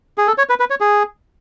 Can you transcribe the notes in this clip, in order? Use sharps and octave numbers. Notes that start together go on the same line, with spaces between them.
G#4
A4
C#5
B4
B4
C#5
G#4